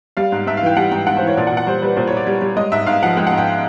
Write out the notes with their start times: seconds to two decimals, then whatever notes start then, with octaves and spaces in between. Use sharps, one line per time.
0.17 G3 F5
0.32 G#2
0.47 G#2 E5
0.57 F5
0.62 E3 G5
0.76 G3 F#5
0.91 G#2 G5
1.06 G#2 F#5
1.17 C5
1.22 E3 C#5
1.37 A#2 D5
1.47 F#5
1.52 A#2
1.57 F#5
1.67 G3 C5
1.82 G3 B4
1.97 A#2 C5
2.07 C#5
2.12 A#2 D5
2.27 G3
2.41 G3
2.56 G#3 D#5
2.72 G#2 E5
2.86 G#2 F5
3.02 F3 F#5
3.17 G#3 G5
3.27 F#5
3.32 G#2
3.38 G5